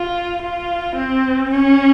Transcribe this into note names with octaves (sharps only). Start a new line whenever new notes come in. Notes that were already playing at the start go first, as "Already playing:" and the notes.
Already playing: F4
F4
C4
C#4